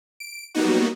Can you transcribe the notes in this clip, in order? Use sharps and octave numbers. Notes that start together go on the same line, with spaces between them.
D7
F#3 G3 A#3 B3 D#4 F#4